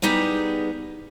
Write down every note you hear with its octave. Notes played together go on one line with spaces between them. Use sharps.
G3 B3 D#4 G4 G#4